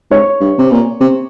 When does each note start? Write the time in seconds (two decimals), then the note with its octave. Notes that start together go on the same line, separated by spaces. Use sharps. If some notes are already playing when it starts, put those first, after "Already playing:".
0.11 G#2 C#5
0.41 G2
0.58 C3
0.71 A#2
1.00 C3